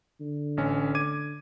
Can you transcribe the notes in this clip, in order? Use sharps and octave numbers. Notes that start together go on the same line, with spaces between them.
D3
A1 C#4
D6 G#6 D#7